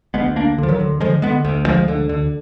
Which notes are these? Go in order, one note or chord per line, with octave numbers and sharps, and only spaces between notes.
D2 G#3 B3
D2 A#3 D4
D3
F3
D#3 F#3
D3
D3 F3 G#3
D3 G#3 B3
D2
D2 F3 G#3
D3
D3